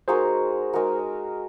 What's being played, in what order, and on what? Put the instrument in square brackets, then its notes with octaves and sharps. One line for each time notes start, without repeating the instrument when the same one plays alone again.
[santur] G#3 D#4 F#4 A#4 [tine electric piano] G#4 C5
[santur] G#3 D#4 F#4 A#4